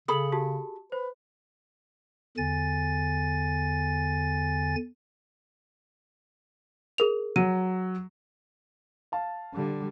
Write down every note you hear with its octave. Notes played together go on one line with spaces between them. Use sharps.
C#3 G#4 A4 B5 D#6 F#7
F#4 G4 A5
B4 C5
E2 D3 G#5 A6
G#4 A#4 F7
F#3 D#7
F5 A5
D3 G3